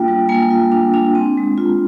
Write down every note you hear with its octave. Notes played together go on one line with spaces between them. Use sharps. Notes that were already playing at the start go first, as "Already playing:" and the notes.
Already playing: A#3 D4 F4 G5
G3
A#3 G#5
F4
D4
D4
C4
G#3
F4